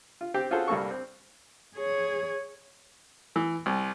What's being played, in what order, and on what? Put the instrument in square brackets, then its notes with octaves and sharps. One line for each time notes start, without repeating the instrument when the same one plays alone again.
[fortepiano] F4
C4 G4
C#4 F4 F#4 G#4 A4 C5
C2 G3 A#3 A4 C#6
C4
[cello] G#4 C#5
[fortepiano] E3
C2